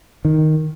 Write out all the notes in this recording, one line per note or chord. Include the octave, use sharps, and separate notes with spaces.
D#3